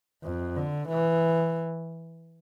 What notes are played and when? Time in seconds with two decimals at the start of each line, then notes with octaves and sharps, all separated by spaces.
0.23 F2
0.56 D3
0.89 E3